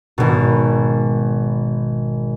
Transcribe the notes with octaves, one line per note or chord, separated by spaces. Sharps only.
G#1 B2